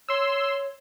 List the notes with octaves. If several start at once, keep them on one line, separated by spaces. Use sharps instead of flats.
C#5 C6 E6